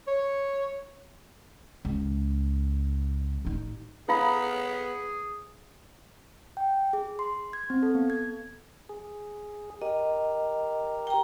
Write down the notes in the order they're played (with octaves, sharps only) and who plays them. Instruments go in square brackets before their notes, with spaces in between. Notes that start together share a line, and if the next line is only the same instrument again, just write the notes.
[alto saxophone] C#5
[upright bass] C#2
A1 D#4
[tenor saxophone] B3 [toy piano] E4 F5 B5 [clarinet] G#4
[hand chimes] G5
G#4
C6
G#6
C4
A4
B3
G#6
[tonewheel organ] G#4
[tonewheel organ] G4 A#4 [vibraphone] D#5
[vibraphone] G5 A#5